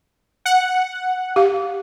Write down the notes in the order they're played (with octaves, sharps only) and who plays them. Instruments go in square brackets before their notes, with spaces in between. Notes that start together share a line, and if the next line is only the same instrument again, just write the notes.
[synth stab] F#5
[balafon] G4 F5